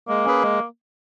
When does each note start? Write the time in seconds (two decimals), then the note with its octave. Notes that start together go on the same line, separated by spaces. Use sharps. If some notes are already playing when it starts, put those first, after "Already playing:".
0.08 G#3 A#3
0.25 C#4 G#4 B4
0.43 G#3